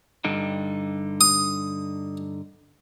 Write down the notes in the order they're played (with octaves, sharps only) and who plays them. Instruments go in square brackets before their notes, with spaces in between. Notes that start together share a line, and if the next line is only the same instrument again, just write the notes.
[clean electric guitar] G2 D3 D#4
[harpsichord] D#6